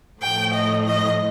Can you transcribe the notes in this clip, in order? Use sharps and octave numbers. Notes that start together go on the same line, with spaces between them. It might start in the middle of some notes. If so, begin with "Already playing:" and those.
A2 F3 A3 G5
D#5
D#5